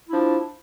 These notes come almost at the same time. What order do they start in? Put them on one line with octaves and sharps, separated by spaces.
E4 F3 D4